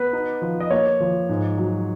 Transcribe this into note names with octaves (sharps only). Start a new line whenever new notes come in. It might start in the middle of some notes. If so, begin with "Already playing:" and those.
Already playing: B3 B4
D#4
F3
D#5
A#3 C#5
F3
G#2
F#3